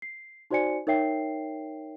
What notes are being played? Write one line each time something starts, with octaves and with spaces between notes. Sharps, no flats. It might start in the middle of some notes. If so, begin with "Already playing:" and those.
C7
D#4 F#4 C5 D5 G#5 C#7
D#4 A#4 C#5 E5 G5 C7